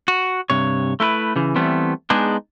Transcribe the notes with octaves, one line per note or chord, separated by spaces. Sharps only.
F#4
G2 C3 C#5
A3 E4 A#4 B4
C#3 E3
E3 G3 A3 B3 C4
G#3 B3 D4 D#4 G#4